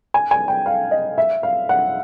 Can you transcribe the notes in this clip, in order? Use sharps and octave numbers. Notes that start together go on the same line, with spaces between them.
G#5
G#5
G5
F5
D#5
E5
F5
F#5